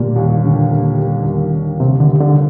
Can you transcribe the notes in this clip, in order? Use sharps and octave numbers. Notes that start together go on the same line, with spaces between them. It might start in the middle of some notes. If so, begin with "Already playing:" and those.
Already playing: A#2 D3 G3 A#3
D#2
D3
A#3
G3
D#2
D3
C3 A#3
D3
G3
D3